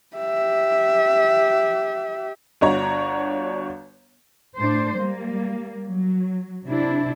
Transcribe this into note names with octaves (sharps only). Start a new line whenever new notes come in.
G4 E5
G1 D4 F#4 C#5 A#5
A2 D4 C5
G3 A#3
F#3
C3 D4 E4